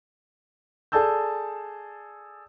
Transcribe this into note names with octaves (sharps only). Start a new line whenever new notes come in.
G#4 A4 D5 A5 E6 G6